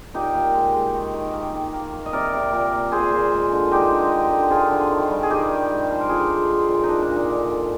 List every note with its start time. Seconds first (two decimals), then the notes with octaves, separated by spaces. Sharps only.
0.14 A#2 D#4 G4
0.34 A#2
0.54 G#3
0.74 G#3
0.94 D#3
1.14 D#3
1.33 A#3
1.54 D#3
1.73 A#3
1.93 A#3
2.06 D#5
2.13 C3 A#4 D5
2.33 C3
2.53 A#2
2.73 A#3
2.92 A#2 G#4 C5
3.12 A#2
3.32 G#3
3.52 D3
3.71 G#3 D#4 G4
3.92 D3
4.12 D3
4.31 D3
4.50 F3 F4 G#4
4.71 D3
4.91 D#3
5.11 G3
5.23 G#4
5.30 D#3 D#4 G4
5.50 D#3
5.71 G#3
5.90 F3 C5
6.01 A#4
6.09 D3 F4 G#4
6.30 G#3
6.49 A#3
6.69 A#2
6.83 D#4
6.89 A#2 D4
7.02 D4
7.09 A#2
7.16 D#4
7.29 D3
7.49 D3